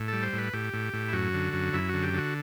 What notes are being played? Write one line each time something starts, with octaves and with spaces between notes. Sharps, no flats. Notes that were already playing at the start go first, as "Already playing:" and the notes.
Already playing: A2
G3 A4
C5
A2
B4
A2 G4
A2
A2
E4
F#2 F#4
D3
F#2
F#2 E4
D3 F#4
G4
D3 F#4